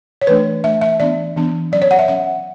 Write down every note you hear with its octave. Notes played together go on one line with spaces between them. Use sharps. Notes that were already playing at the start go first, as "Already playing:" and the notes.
C#5
E3 A3 D4 B4
E3 A3 D4 E5
E5
E3 B3 D4 D5
E3 B3 D4
F#3 C#4 D5
C#5
F#5
E5
F#3 C#4 F#5